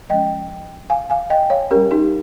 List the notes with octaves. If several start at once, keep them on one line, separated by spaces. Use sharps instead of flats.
F3 G#3 C#4 D#5 G5
F5 G#5
F5 G#5
D#5 G5
C#5 F5
G3 C#4 G4 A#4
D#4 G4